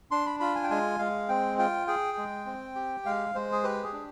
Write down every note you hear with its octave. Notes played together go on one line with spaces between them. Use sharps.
D4 C6
B5
F4 B5
G#5
G5
G#3 G#5
G#3 F5
C4 G5
F4 G5
G#4 G5
G#3
C4
G4
G#3 F5
G#3 C5
G#4
G4 B4
G#4
D4